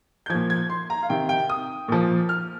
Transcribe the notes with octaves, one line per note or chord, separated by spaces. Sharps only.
G6
A#2 F3 G#6
G#6
C6
A#5
F5
C3 D#3 G5
G5
D#6
A#2 F3
F6